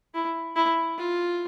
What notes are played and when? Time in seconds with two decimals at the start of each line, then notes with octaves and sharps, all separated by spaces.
0.14 E4
0.56 E4
0.98 F4